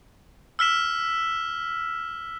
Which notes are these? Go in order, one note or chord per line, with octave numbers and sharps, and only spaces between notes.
E6 F6 B6 E7